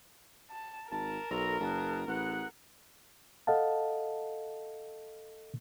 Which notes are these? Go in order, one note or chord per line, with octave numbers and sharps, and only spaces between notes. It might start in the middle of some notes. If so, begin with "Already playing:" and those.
A5
G#1 A#4 A5
B1 A4 A#5
F#1 G#4 B4 A5
A1 G#4 B4 F#5
A4 D#5 F5 F#5 A5